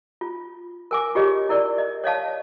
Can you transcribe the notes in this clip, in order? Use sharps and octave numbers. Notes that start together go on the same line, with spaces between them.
F4
A#4 G#5 D6
F4 G4 G#4 C#5 D#5
E4 A#4 D5
D#5
C#5 D#5 F5 A5